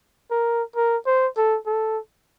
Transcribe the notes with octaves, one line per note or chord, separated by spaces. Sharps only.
A#4
A#4
C5
A4
A4